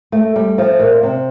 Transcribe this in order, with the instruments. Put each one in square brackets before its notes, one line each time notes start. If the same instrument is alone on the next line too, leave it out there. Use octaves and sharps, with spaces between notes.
[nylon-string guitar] A3 [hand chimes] A4
[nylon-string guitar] G3
[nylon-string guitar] F3 [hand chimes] E5
[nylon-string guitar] A#2
[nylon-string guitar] C3 [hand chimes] C4